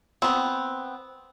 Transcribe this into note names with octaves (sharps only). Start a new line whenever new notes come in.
B3 C4